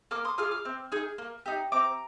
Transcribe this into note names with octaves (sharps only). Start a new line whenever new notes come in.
A#3 D6 F6
C6 D#6
F4 G#4 D6 F6
D6 F6
C4
D#4 G#4
A#3
D#4 G4
C4 A#5 D6